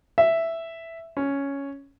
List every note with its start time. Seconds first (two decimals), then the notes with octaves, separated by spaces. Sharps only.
0.18 E5
1.17 C#4